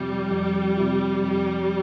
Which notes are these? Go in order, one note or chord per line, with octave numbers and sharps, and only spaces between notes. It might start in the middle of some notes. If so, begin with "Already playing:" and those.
Already playing: F2 C3 F3 G3
F2
C3 F3
F2